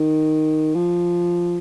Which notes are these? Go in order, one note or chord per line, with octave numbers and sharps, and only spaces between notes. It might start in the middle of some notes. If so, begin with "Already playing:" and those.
Already playing: D#3
F3